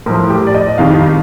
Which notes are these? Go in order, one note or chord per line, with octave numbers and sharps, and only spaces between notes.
A2 F3 A#4
G4
D5
D#5
F2 D#3 G3 F5